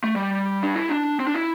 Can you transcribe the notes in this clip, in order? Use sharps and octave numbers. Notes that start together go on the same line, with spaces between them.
A3
G3
D4
E4
D4
C4
D4
E4